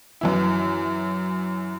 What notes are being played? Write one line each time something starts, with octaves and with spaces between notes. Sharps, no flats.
F#2 E3 E4